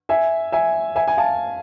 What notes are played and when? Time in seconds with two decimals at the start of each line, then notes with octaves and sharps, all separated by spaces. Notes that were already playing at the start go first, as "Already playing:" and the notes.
0.09 E5 G#5
0.52 E5 G#5
0.96 E5 G#5
1.07 G#5
1.17 F5 A5